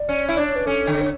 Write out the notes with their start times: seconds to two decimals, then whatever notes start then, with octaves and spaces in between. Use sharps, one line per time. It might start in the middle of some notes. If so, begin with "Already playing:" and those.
Already playing: D5
0.09 C#4
0.29 E4
0.34 D4 D5
0.45 C#5
0.56 B4
0.66 C#4 A4
0.87 D3
1.01 C#5